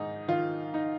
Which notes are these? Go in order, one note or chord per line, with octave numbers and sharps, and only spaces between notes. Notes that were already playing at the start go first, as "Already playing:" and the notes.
Already playing: G#2 D#3 D#4
D#3 F4
D#4